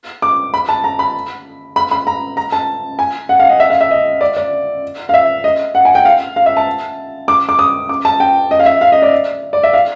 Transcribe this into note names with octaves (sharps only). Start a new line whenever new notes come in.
D6
B5
A5
A#5
B5
B5
B5
A#5
A#5
A5
G#5
F#5
F5
D#5
E5
F5
E5
D#5
D5
D5
F5
E5
D#5
F#5
G#5
G5
F5
F5
E5
A5
D6
D6
D#6
D6
A5
G5
D#5
F5
E5
F5
D#5
D5
D5
E5
F5